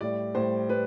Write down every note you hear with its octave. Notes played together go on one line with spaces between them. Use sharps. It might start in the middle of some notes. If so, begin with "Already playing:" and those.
A2 G3 D5
A2 G3 C5
G3 B4